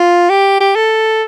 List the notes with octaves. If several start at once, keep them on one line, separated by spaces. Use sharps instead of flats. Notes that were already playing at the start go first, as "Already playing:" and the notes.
Already playing: F4
G4
G4
A4